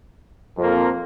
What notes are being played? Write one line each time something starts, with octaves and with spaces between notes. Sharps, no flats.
F2 F3 A#3